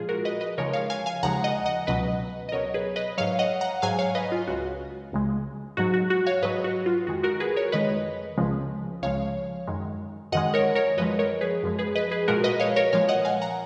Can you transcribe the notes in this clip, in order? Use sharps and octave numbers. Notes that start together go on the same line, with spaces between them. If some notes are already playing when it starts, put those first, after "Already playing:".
Already playing: A#2 F3 G#3 F4 G#4
F#4 A#4
B4 D#5
B4 D#5
D#2 C#3 F3 G#3 A#4 C#5
C#5 F5
F5 G#5
F5 G#5
D#2 C#3 F3 G#3 F#5 A#5
D#5 F#5
D#5 F#5
C#2 B2 F#3 B4 D#5
D#5
C#2 B2 F#3 A#4 C#5
G#4 B4
B4 D#5
G#2 F#3 C#5 F5
D#5 F#5
F#5 A#5
G#2 F#3 F5 G#5
C#5 F5
B4 D#5
F4
C#2 C#3 G#3 F#4
C#2 C#3 G#3
G#2 F#3 F#4
F#4
F#4
C#5 F5
G#2 F#3 B4 D#5
F#4
F4
F2 D#3 G#3 F#4
F#4 A#4
G#4 B4
A#4 C#5
F2 D#3 G#3 B4 D#5
C#2 C#3 F3 G#3
C#2 C#3 F3 G#3 C#5 F5
F#2 D#3 G#3
F#2 D#3 G#3 D#5 F#5
A#4 C#5
A#4 C#5
F#2 F3 G#3 B4 D#5
A#4 C#5
G#4 B4
F#2 F3 G#3
G#4 B4
B4 D#5
G#4 B4
A#2 F3 G#3 F#4 A#4
B4 D#5
C#5 F5
A#4 C#5
A#2 F3 G#3 C#5 F5
D#5 F#5
F5 G#5
F#5 A#5